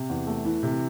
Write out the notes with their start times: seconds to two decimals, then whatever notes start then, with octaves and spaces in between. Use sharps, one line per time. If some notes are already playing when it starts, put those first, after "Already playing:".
Already playing: C3
0.09 E2
0.27 A3
0.45 E3
0.63 C3